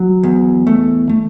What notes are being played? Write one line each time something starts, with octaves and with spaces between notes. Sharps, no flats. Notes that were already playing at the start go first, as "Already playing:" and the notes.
Already playing: F#3
E2
A3
A3